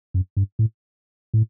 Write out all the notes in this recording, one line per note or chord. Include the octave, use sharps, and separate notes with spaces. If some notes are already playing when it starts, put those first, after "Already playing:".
F#2
G2
A2
A2